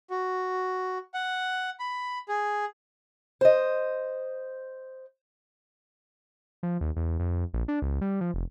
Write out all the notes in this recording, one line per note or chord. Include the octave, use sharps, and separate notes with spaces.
F#4
F#5
B5
G#4
C5 D#5
F3
D#2
E2
F2
A#1
D4
C#2
G3
F3
F1